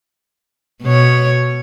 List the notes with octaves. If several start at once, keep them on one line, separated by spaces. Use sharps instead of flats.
B2 C#5